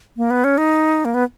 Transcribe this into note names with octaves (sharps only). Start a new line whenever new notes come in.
A#3
B3
C#4
D#4
A#3
B3